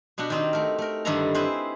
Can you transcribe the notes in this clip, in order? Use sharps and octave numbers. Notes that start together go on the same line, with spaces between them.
B2 B3 D4 F#4 G4
D#3 C4 D#4
A3 A#4
A3 A#4
G2 D3 D#3 E4 A4 A#5
C4 E4 G#4 B4 C5